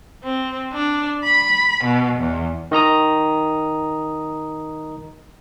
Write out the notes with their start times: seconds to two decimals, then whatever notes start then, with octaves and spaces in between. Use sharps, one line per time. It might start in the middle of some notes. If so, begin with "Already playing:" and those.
0.24 C4
0.73 D4
1.23 B5
1.84 B2
2.19 E2
2.71 D#3 D#5 A#5 D#6